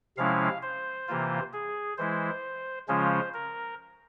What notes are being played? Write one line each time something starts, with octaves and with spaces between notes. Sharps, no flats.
C3 F3 G#3 C#4 E4 F5
C5
C3 E3 A#3 F4
G#4
E3 G#3 E4 C5
C#3 F3 G#3 C#4 F4 C5
A#4